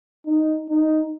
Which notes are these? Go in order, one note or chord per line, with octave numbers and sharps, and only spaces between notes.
D#4
D#4